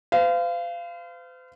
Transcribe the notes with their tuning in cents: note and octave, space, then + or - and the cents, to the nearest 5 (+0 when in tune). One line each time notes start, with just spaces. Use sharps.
C5 -45 F5 -20